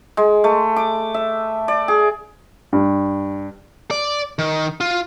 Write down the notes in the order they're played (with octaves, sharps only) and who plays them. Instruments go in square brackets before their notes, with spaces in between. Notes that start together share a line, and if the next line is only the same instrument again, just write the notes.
[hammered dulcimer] G#3
A3
D6
E5
D5
G#4
[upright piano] G2
[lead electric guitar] D5
D#3
F4